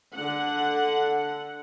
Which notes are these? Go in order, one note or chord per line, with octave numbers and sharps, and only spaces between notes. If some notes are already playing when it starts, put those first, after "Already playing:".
D3 F#5